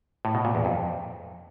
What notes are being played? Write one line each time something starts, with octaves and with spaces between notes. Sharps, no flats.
A2
B2
A#2
E2
F2